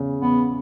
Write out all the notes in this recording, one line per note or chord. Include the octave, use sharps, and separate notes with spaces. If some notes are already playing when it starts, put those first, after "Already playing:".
Already playing: E2 C#3
E2 B3